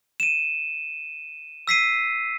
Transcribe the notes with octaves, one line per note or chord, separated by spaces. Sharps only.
D#7 E7
E6 B6 C7 D#7